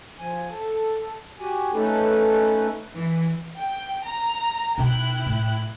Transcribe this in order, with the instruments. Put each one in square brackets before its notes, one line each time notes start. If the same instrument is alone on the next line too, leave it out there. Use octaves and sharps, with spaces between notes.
[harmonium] F3 G#5
A4
F#4 G4 G#5
A3 C#4 D#4 A4 B4
[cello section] E3
[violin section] G5
A#5
[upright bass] B2 D#4 [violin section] E4 G5 F#6
[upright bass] A2